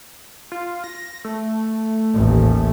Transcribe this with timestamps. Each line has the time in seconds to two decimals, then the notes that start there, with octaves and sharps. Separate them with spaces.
0.52 F4
0.84 A#6
1.24 A3
2.14 A1 D#2